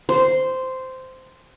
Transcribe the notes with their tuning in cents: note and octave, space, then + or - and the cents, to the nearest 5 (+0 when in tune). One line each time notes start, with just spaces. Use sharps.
C5 -10